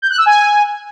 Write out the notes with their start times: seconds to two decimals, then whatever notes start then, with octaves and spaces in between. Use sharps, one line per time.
0.02 G6
0.10 F#6
0.18 E6
0.26 G#5